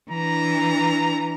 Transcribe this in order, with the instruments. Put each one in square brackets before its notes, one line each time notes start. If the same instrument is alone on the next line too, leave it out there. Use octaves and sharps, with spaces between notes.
[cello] E3 D4 [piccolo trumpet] A#5